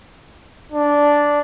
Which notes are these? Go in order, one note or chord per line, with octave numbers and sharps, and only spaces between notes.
D4